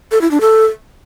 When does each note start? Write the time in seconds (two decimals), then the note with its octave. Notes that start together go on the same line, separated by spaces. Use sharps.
0.12 A4
0.21 E4
0.31 D4
0.41 A4